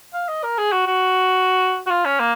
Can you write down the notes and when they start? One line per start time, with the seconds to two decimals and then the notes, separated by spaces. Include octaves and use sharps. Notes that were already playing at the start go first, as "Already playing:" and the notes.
0.14 F5
0.28 D#5
0.43 A#4
0.58 G#4
0.72 F#4
0.87 F#4
1.87 F#4
1.90 F4
2.05 C#4
2.20 A#3